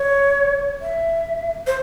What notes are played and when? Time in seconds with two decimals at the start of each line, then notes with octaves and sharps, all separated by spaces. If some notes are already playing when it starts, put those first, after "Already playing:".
Already playing: C#5
0.81 E5
1.67 C5